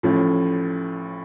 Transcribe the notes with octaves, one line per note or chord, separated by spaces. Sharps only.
A1 A2 F3